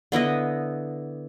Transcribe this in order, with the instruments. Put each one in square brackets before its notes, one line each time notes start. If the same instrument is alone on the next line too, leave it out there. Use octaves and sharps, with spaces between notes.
[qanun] D3 B3 E4 D#5